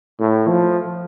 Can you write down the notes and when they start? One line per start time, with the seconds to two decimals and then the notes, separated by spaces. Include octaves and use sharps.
0.20 A2
0.48 F3